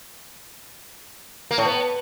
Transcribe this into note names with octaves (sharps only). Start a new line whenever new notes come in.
A#3
A2
B3